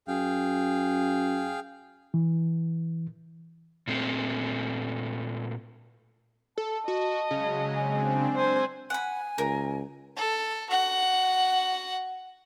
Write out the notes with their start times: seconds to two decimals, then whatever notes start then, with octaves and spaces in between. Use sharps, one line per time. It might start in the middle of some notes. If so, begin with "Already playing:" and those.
0.08 F#2 G#4 F5 G5
2.14 E3
3.87 A#2 A3 C4
6.58 A4 A5
6.88 F#4 D#5
7.31 C#3 F#3 G#3
7.75 C4 D4 G#5
8.36 C5 G#5 E6 F#6 G#6
8.90 F#5 G#5 B5
9.38 C#2 A#4
10.17 A4
10.70 F#4 F#5